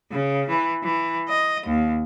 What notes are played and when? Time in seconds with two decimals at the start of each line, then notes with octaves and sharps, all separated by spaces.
0.11 C#3
0.49 E3
0.83 E3
1.29 D#5
1.66 D#2